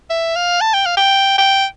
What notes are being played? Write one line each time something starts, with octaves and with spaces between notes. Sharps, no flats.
E5
F5
A5
G5
F5
G5
G5